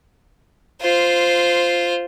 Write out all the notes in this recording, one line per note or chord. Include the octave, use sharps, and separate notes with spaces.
F4 C5